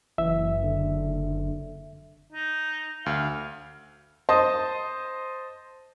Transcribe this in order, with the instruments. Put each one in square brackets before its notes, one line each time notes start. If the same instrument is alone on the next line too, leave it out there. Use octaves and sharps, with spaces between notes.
[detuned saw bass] F#1 [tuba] E3 [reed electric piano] E5
[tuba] D3
[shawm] D#4
[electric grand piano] D2 [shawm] F5
[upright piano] C5 D#5 A5 D#6